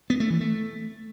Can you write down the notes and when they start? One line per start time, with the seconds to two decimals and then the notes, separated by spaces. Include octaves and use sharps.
0.10 B3
0.20 A3
0.30 E3
0.40 A3